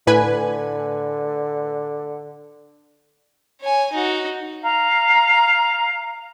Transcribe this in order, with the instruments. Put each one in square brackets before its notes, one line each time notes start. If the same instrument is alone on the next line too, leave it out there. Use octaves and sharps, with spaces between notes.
[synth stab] A2 B4 G#5 [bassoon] D3
[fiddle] C#5 G#5
D#4 F#4
[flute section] F5 A#5